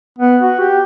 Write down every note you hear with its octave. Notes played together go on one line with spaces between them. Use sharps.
B3
F#4
G4